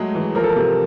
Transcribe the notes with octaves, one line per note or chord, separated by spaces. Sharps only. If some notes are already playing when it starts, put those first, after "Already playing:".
Already playing: F#3 G#3 A3 G#4
E3
F3 A#4
A4
A#4
C3